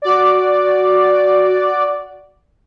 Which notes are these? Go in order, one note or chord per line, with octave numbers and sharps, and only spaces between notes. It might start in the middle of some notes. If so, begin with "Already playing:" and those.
F#4 D5